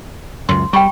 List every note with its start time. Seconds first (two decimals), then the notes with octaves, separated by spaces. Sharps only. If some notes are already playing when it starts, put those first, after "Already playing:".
0.49 C#2 F#2 C6
0.73 G3 G5 B5 C#6